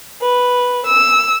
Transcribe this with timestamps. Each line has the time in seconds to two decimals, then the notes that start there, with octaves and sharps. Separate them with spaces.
0.21 B4
0.87 E6